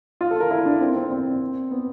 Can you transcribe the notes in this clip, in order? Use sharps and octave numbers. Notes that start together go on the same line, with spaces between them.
F4
A4
A#4
E4
D4
C4
C4
C4
B3